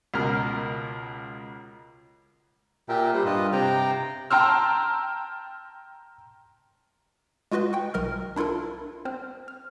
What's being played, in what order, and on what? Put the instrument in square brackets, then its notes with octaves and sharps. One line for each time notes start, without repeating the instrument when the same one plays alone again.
[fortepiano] C#2 B2 A#4 F6
[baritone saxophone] A#2 [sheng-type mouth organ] G4 E5 G5
[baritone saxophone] G3 [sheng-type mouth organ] C5
[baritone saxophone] G2 [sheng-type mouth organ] F4 B4 D#5
[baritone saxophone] C3 [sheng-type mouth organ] G5 A#5
[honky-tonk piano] G5 A5 A#5 C6 E6 F6
[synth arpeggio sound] G#3 F4 F#4 B4 D#5
G5 G#5 C#6
B1 A#4 D#5 F6
D4 E4 F4 A4 A#4
C4 C5 F6
F6